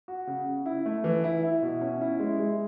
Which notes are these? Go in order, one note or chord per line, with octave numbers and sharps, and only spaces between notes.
F#4
C#3
C#3
E4
A3
E3
E4
E4
B2
C#4
E4
G#3
G#3